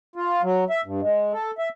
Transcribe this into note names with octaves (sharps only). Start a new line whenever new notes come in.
F4
F#3
E5
G2
G#3
A4
E5